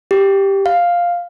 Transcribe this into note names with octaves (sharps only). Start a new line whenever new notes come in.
G4
F5